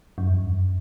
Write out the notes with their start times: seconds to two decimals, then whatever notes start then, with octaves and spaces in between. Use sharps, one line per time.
0.18 F#2
0.34 E2
0.41 G2
0.50 F#2